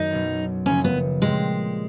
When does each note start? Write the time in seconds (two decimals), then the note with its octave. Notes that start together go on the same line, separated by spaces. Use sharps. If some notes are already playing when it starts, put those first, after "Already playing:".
Already playing: F#2 D#3 D#4
0.11 B1 B2 F#3 B3
0.66 F#1 F#2 C#3 F3 A#3 C#4
0.84 B3
1.22 A#2 G3 G#3 C4